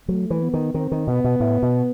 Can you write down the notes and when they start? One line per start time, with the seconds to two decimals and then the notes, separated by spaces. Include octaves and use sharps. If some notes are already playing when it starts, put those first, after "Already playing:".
0.08 F#3 A3
0.30 E3
0.42 B3
0.54 D#3
0.74 D#3 C4
0.92 D#3
1.07 B2 B3
1.24 B2
1.40 A2
1.63 B2